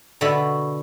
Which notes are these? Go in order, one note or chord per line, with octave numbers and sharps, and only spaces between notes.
B2 D3 F#4 B4 E5 B5